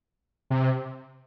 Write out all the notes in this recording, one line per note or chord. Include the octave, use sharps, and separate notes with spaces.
C3